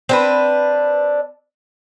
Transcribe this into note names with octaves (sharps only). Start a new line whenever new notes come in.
C4 D4 B4